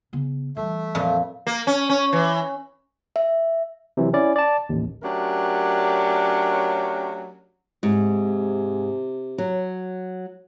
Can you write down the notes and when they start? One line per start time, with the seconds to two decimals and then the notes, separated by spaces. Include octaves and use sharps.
0.13 C#3 B3
0.57 E3 G3 A3 E5
0.95 F2 A#2
1.47 A#3
1.67 C#4
1.89 C#4
2.13 E3
3.16 E5
3.97 C3 E3 F#3
4.13 C#4 E4 D5
4.36 D5 A5
4.69 A1 D#2
5.02 F#3 A3 C#4 D4 G4 A#4
7.83 G#2 C3
9.38 F#3